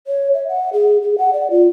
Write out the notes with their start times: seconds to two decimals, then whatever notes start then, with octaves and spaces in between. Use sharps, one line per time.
0.07 C#5
0.34 E5
0.48 F#5
0.73 G#4
1.02 G#4
1.18 F#5
1.33 D5
1.50 F4